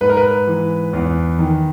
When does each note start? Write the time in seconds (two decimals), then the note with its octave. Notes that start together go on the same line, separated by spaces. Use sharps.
0.01 G#2 B4
0.09 A#4
0.17 B4
0.47 E3
0.93 E2
1.39 D#3